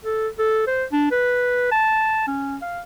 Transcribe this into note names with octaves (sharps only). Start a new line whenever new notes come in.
A4
A4
C5
D4
B4
A5
C#4
F5